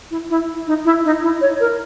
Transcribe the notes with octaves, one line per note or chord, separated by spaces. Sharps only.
E4
E4
D#4
E4
D#4
E4
C#5
A#4